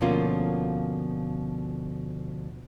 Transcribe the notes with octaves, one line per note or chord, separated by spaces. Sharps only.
D2 B2 F3 A#3 C#4 F4